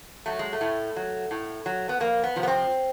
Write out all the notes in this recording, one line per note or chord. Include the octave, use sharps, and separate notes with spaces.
F#3 A3
G#3
A3
A2
F#3
A2
F#3
B3
F2 A#3
B3
C3 F3
B3
C4